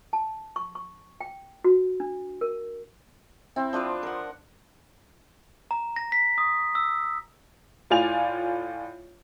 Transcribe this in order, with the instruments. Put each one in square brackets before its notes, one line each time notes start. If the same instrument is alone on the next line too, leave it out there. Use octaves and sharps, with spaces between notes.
[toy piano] A5
C#6
C#6
G5
F#4
D4
A#4
[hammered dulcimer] C4 E4
F3 D4 B4 C5
A#4 F#5
[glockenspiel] A#5
A#6
B6
D#6
E6
[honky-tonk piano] A2 F4 D5 G#5 F7